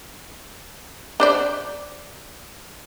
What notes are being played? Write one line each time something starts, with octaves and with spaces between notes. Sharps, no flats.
D4 C5 D5